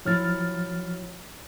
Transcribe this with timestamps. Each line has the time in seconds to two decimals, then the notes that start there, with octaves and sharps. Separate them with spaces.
0.05 F3 F#3 E4 F6 A6